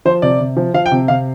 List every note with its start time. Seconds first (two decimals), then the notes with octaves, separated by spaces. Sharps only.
0.05 F3 C5
0.22 C3 D5
0.40 C3
0.57 F3
0.74 F3 F5
0.86 G5
0.91 C3
1.08 C3 F5